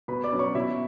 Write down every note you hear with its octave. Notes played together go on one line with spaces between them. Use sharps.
B2 B4 B5
D5 D6
F#3 C#4
C#5 C#6
B2 E4 E5